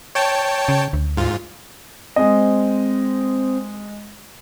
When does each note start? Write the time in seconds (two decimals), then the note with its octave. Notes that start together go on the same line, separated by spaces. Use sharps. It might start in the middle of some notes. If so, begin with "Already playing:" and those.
0.15 C#5 G5 A5
0.68 C#3
0.93 D2
1.17 G#2 F4
2.16 G#3 C4 D#5